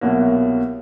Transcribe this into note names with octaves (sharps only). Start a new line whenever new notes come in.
C2 B2 F#3 A#3